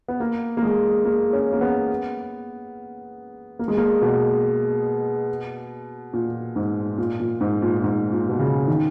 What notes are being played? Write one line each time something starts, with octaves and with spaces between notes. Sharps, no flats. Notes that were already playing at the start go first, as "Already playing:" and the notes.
B3
A#3
A#3
G#3
A#3
C#4
A#3
B3
A#3
G#3
A#3
B2
A#2
G#2
A#2
A#2
G#2
A#2
A#2
G#2
A#2
B2
C#3
D#3